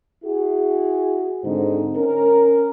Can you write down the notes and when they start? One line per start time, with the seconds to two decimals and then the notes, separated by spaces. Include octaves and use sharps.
0.24 E4 F#4 G#4
1.44 G#2 D3 C4 D#4 C5
1.96 C#4 A#4